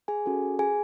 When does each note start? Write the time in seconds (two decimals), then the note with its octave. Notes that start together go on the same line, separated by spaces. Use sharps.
0.08 G#4 G#5
0.26 C#4 F#4 A4
0.59 G#4 G#5